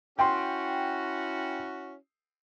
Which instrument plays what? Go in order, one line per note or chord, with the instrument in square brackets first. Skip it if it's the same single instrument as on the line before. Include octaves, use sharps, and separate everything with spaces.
[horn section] C#4 E4 F#4 [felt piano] G5 C6